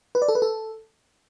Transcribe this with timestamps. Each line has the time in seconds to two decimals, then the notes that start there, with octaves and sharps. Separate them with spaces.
0.15 B4
0.22 D5
0.28 A4
0.35 B4
0.42 A4